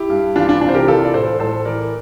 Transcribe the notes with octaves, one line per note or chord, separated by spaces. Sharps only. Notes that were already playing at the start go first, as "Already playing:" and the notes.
Already playing: E4 G4
G2
E3 D4 F4
D4 F4
C3 D4 F4
C5
G4 A#4
E3 F4 A4
D5
A2 A4 C5
A2 A4 C5
E3 A#4 D5